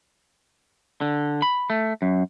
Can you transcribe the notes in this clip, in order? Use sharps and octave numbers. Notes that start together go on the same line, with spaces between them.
D3
B5
A3
F#2